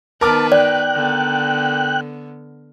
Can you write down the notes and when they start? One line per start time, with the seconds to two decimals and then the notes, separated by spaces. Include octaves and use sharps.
0.21 D#3 B3 A#4 B4 A5 D6 F6
0.52 D5 G5 F#6
0.94 D3 B3